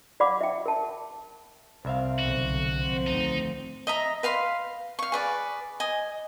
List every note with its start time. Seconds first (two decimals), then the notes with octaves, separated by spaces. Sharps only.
0.20 D5 F5 F#5 B5 D6
0.41 E5 G5
0.66 A#4 A5
1.85 C2 C4 E5 F5
2.19 B1 D3 F#4
2.78 F3 C4
3.07 D2 A2 D#3 D#4
3.87 D#5 E5 A#5
4.23 B4 F5 B5 C6
4.99 F5 C#6
5.12 G#4 B4 D5
5.80 D#5 G#5